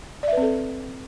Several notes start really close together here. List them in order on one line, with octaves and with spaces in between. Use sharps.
D5 E5 B4 C4 A4